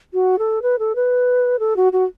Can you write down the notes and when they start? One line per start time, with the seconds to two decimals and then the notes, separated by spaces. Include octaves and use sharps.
0.13 F#4
0.39 A4
0.62 B4
0.79 A4
0.95 B4
1.59 A4
1.76 F#4
1.93 F#4